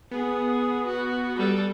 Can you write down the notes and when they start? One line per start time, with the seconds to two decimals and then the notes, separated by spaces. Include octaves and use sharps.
0.11 B3 G#4
0.86 F#4
1.37 G3 A4